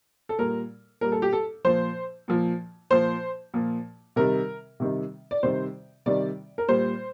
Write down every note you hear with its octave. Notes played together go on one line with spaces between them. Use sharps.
A4
A#2 G3 A#4
A#2 G3 A#4
A4
G4
A4
A#2 F3 C5
A#2 F3
A#2 F3 C5
A#2 F3
C3 D#3 G3 A#4
C3 D#3 G3
D5
C3 D#3 G3 C5
C3 D#3 G3 D5
A#4
A#2 G3 C5